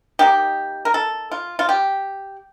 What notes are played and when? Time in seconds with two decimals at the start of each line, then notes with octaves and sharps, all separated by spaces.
0.19 D#3 A#3 D#4 G4
0.85 A#4
0.94 A4
1.31 F4
1.59 F4
1.69 G4